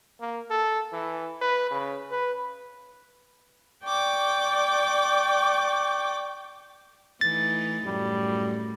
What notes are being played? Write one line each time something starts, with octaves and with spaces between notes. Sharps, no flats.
A#3
A4
E3
B4
C#3
B4
D5 G5 C#6 D6
E3 A3 D#4 A6
F#2 A2 G3